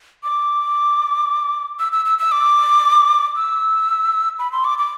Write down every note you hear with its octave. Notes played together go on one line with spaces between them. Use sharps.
D6
E6
E6
E6
E6
D6
E6
B5
C6
D6
D6